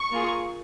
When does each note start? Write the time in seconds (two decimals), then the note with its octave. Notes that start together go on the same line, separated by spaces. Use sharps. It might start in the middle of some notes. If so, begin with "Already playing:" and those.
Already playing: C#6
0.11 A#3 F4 G#4